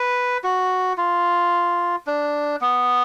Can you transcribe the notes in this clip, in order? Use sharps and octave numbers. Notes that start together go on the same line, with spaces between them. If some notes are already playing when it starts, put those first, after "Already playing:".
Already playing: B4
F#4
F4
D4
B3